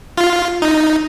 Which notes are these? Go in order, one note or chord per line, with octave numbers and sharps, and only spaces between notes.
F4
D#4